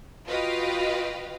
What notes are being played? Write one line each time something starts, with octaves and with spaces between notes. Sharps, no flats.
F4 F#4 B4 D#5 F5 G5